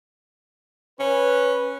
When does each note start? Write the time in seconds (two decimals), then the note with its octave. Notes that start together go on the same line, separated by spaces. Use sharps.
1.00 C#4 B4